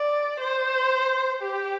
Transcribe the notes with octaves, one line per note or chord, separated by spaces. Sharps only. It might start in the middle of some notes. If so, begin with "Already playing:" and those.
Already playing: D5
C5
G4